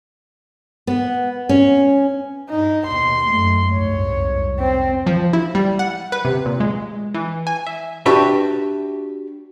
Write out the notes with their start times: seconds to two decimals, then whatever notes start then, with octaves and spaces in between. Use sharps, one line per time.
0.87 B3
1.49 C#4
2.50 G2 D#4
2.87 D#2 B2 C6
3.27 F#2 A3
3.72 C2 F2 G#2 C#5
4.59 C4
5.06 F3
5.33 E4
5.55 G3
5.79 F#5
6.12 B4
6.25 C3
6.46 A#2
6.60 G#3
7.14 E3
7.47 G#5
7.67 E5
8.06 D4 F#4 G4 B4 E5